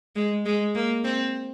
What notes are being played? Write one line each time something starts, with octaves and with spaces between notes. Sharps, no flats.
G#3
G#3
A#3
C4